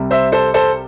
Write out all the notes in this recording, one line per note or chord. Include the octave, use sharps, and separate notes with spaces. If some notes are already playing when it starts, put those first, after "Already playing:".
Already playing: C2 C3 G3
C5 E5
A4 C5
A4 C5